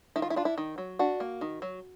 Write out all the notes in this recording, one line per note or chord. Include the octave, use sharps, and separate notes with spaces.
D#3 E4
F4
E4
D4 F4
E4
D#3
F#3
D4 F#4
A#3
D#3
F#3